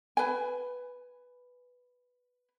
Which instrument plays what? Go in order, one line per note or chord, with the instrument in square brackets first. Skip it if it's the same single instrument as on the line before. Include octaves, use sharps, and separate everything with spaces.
[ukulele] B4 G#5